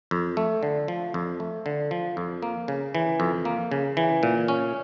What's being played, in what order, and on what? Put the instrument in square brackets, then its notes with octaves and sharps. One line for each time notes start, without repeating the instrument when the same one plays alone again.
[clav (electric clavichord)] F2
A3
D3
F3
F2
A3
D3
F3
F2
A#3
C#3
E3
F2
A#3
C#3
E3
A#2
C#4